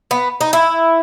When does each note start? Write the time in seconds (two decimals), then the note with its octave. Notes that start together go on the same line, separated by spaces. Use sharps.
0.11 B3
0.41 D#4
0.53 E4